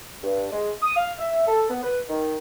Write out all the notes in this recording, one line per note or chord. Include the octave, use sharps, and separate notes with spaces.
G2
G#3
D#6
F5
E5
A4
B3
B4
D#3